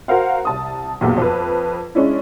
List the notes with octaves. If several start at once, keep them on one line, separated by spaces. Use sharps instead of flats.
F#4 A#4 C5 F5 F#5
C2 A5 D#6
B1 E2 G2 A#2
F2 B4
G#3 C#4 D4 E4